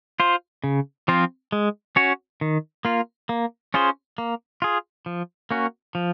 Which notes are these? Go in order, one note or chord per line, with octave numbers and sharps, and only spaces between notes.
F4 C5
C#3
F3 C4 F4
G#3
C#4 F#4 C#5
D#3
A#3 F4
A#3
C#4 F4 G#4 C5
A#3
F4 G#4
F3
A#3 C#4 F#4
F3